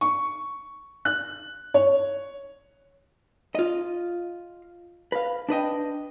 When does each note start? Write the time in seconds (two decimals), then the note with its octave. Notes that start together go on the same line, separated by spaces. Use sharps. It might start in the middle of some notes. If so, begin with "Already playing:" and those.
0.01 C#6
1.05 F#6
1.74 C#5
3.55 F4 D#5
5.12 B4 F5
5.49 D4 B4 D#5 G5